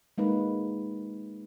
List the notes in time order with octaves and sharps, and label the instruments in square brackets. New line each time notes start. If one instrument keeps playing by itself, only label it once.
[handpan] G#3 A#3 D#4 B4